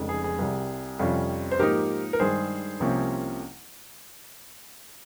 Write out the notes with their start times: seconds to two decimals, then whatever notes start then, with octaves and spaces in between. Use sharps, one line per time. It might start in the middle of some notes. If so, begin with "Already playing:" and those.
Already playing: F1 F2 C#3 G#3 D#4
0.09 G#4
0.24 G#4
0.39 C2 C3 G3
0.99 F2 C3 G3 C#4 F4
1.51 C5
1.59 G#2 F3 A#3 D#4 G4 A#4
2.13 A#4
2.20 G2 D#3 G#3 G#4 C5
2.80 C2 C3 F3 A#3 C#4